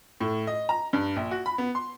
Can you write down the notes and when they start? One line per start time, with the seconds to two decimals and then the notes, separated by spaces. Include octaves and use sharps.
0.21 A2
0.47 D#5
0.69 A#5
0.93 G2
1.16 A#1
1.31 F#4
1.46 B5
1.58 B3
1.75 C6